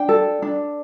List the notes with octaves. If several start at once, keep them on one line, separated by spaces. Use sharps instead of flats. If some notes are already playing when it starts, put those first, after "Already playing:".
Already playing: D4 G5
A4
D4